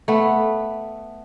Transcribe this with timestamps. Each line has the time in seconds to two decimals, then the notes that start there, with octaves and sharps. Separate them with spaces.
0.08 A3 B3